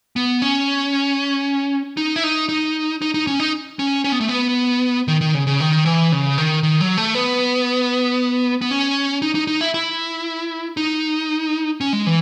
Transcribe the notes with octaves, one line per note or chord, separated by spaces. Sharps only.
B3
C#4
D#4
E4
D#4
D#4
D#4
D#4
C#4
D#4
C#4
C#4
B3
A3
B3
D#3
D#3
C#3
C#3
D#3
E3
C#3
D#3
D#3
F#3
A3
B3
B3
C#4
D#4
D#4
D#4
E4
E4
D#4
C#4
G#3
E3